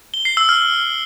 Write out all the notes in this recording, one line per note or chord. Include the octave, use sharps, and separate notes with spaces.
G7
C7
E6
F6